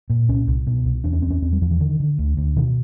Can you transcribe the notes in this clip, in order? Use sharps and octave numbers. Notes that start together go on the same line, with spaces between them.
A#2
C2 C#4
C2
B2
C2
E2 D4
C#4
E2 C4
C#4
E2 C4
G3
E2 F3
E3
D3 D#3
D3
D2
D2
B2 D#3